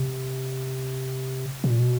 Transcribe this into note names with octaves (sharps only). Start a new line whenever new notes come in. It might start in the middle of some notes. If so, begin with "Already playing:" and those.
Already playing: C3
B2
A#2
B2